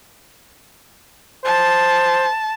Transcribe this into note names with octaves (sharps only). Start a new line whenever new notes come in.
C5 A5